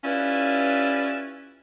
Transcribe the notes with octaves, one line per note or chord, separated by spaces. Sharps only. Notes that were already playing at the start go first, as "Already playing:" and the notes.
C#4 E4 F4 G4 B4 D5